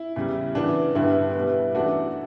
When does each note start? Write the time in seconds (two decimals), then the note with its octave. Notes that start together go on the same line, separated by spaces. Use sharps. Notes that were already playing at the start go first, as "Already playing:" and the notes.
Already playing: E4
0.16 E2 C#3 G3
0.55 C#3 E3 B3 D4
0.95 G2 D3 G3 B3 E4
1.35 B2 G3 B3
1.75 F#2 E3 A3 D4 F#4